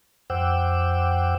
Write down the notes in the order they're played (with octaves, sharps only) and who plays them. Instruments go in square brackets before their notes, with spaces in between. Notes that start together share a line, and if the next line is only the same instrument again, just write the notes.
[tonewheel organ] F2 C5 F#5 G5 D6 E6